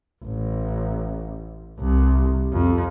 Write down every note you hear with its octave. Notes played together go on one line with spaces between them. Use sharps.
A1
C2
F2